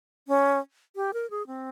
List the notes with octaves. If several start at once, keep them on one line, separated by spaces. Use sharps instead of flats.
C#4
G4
A#4
G#4
C4